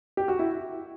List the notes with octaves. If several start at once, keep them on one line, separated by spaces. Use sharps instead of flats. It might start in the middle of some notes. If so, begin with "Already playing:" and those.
G4
F#4
E4